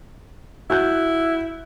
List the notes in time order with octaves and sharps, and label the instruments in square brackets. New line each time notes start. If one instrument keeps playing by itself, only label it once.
[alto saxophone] E4 [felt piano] F#4 F#6 G6